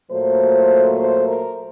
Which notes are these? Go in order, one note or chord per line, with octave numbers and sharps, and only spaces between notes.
A#2 F#3 A3 C5
C5
A#4